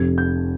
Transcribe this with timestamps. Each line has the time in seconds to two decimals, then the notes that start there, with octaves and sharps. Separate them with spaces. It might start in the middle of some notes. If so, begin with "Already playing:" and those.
Already playing: F1 F2 C3 G#6
0.18 G6